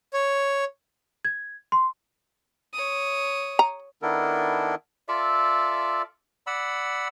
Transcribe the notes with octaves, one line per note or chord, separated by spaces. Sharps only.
C#5
G#6
C6
C#5 D#6
A#5
D#3 B3 D4 E4 A4 A#4
F4 A4 D5 E5
D5 F#5 B5 E6